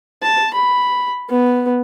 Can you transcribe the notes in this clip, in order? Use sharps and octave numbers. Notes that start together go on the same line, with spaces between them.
A5
B5
B3